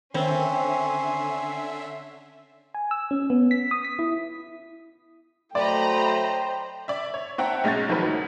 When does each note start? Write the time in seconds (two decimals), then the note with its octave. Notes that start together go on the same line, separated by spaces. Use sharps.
0.14 D3 D#3 C4 C#4 C5 C#5 E5 C6
2.75 G#5
2.91 E6
3.11 C#4
3.30 B3
3.51 B6
3.71 D#6
3.85 B6
3.99 E4
5.55 F#3 A3 C5 D5 D#5 G5 A#5 B5
6.88 D5 E5
7.14 C#5
7.38 C4 E5 F#5 G5 A5 A#5
7.64 B1 G#3 C#4 G6 A6
7.89 D#3 F3 F#3 F#4 A#4 B4
8.02 D2